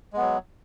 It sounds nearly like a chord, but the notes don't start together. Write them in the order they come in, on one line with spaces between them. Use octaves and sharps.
G#3 B3 F#3